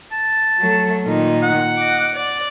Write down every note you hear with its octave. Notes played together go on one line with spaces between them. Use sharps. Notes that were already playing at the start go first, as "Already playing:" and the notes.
A5
F#3 A3
A#2 D#3 D#4
F#5
D#5 D6
D5